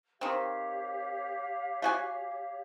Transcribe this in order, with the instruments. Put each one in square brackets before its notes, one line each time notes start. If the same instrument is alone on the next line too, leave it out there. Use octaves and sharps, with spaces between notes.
[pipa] D#3 C4 [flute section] G4 C#5 F5
[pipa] A3 F#4 G#5